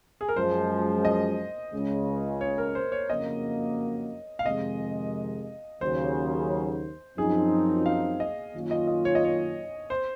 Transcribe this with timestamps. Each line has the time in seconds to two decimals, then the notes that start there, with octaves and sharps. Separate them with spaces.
0.21 G#4
0.29 A#4
0.36 F#2 F3 G#3 C5
1.05 D#5
1.73 C#2 C#3 G#3
2.41 C#5
2.58 A#4
2.75 C5
2.92 C#5
3.09 F#1 F2 C#3 F#3 A#3 D#5
4.39 F5
4.45 F2 C3 D#3 G#3 D#5
5.81 D#2 C#3 F#3 C5
7.18 F#2 F3 C4 D#4 G#4
7.86 F5
8.20 D#5
8.54 F#2 D#3 A#3 C#4 F4
8.71 D#5
8.88 D#5
9.05 C#5
9.15 D#5
9.24 C#5
9.90 C5